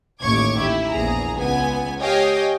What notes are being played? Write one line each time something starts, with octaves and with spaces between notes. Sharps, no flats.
A1 D#2 C#5 C#6 D6 G#6
E4 G4
A#1 E2 G#4 A#5
C#2 B3 G#5
G4 C#5 D#5 F5 G5 G#5